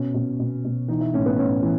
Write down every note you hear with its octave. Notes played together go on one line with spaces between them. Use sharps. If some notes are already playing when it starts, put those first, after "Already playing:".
Already playing: B2 C#4
B2
B2
B2
E3 D#4
E4
A2 C#4
B3
A2 C#4
E3